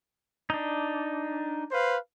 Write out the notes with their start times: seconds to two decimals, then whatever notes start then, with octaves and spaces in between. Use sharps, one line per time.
0.50 D4 D#4
1.71 B4 C5 F5